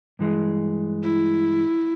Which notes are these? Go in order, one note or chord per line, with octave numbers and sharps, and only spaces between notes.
G2 E3 G#3
E4